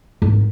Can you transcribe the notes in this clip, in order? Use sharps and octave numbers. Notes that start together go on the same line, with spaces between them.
G#1